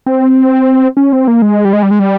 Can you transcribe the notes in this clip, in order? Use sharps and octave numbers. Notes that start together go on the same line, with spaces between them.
C4
C#4
C4
A#3
G#3
G3
G#3
G3
G#3
G3